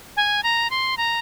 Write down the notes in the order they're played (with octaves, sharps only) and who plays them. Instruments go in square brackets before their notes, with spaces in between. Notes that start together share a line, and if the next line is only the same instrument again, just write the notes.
[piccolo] G#5
A#5
C6
A#5